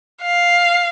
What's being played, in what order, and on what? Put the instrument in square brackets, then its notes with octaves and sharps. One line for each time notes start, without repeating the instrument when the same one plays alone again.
[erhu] F5